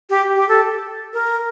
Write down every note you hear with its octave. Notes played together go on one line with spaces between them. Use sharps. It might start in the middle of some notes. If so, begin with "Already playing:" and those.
G4
G4
A4
A#4